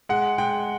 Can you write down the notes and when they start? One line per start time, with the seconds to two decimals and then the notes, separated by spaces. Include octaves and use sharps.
0.09 G#3 F#5
0.38 G#3 G5